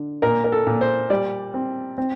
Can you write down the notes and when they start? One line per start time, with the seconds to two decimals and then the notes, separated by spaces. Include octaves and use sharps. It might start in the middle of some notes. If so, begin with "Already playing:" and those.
Already playing: D3
0.22 A#2 A#4
0.44 A#4
0.52 A4
0.66 A#2
0.81 C5
1.10 G3 D5
1.54 C4
1.98 C4